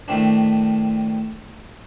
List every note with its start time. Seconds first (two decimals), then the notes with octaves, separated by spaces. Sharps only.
0.08 A2 D#3 A3 C4 D4